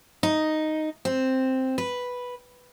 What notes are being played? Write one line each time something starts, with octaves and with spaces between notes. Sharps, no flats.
D#4
C4
B4